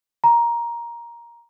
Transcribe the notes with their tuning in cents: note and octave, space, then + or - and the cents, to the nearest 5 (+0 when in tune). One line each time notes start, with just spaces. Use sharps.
A#5 +10